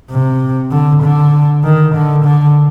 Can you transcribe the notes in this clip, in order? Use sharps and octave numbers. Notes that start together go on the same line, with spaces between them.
C3
D3
D3
D#3
D3
D3